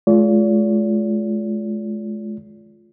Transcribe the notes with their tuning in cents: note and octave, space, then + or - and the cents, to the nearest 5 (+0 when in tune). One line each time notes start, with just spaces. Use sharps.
G#3 +40 F4 +0 D5 -45